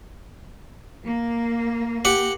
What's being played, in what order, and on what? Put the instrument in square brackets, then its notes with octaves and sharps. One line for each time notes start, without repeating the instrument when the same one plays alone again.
[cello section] A#3
[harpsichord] G4 F#5